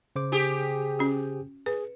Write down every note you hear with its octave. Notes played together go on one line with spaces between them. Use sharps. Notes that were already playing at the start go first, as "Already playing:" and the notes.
C#3 C5 D6
G4 G#4
C#4 F#4
G#4 B4